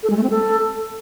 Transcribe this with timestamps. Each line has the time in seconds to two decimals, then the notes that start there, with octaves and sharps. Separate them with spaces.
0.03 A4
0.10 G#3
0.17 A3
0.23 C4
0.30 A4